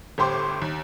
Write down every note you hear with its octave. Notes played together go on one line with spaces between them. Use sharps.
G1 A2 G4 C5 C6 D6
D#2